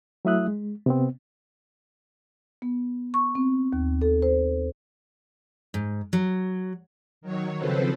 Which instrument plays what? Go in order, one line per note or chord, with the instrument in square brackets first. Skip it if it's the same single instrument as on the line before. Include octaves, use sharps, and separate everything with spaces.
[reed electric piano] F#3 A3 E4 E5 D#6 F#6
G#3
C3 B3 C4
[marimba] B3
C#6
C4
D#2
A4
C5
[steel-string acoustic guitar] G#2
F#3
[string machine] D#3 F#3 C#5
C#3 F3 C4 A4 B4 C5